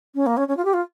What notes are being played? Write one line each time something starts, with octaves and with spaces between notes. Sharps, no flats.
C#4
A#3
C#4
C#4
F4
G4
F4